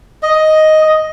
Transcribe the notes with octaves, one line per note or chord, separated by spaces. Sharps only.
D#5